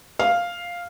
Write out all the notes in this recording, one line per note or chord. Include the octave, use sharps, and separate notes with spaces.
F5